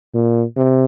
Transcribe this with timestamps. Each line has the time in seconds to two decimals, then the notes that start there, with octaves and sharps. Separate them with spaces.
0.14 A#2
0.57 C3